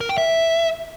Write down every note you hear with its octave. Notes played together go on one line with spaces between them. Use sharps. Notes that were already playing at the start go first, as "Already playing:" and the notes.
A#4
G5
E5